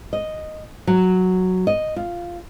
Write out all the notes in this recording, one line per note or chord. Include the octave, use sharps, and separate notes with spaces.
D#5
F#3
D#5
F4